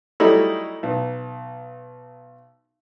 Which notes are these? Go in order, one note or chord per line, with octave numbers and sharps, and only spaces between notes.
F#3 G3 A3 D#4 E4
B1